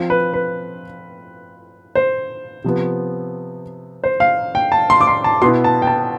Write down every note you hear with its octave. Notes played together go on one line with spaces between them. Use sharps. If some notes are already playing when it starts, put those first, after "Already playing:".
Already playing: F3 C4 F4
B4
B4
C5
C3 F3 B3
C5
F5
G5
A5
C6
D6
C6
A5
B2 B3 E4 C6
A5
G5
A5